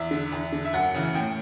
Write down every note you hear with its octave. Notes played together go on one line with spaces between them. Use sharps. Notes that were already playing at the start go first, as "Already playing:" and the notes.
Already playing: E2 E5
D3
E2
D3
E5
F#2 F#5
C#3 E3
A2 G5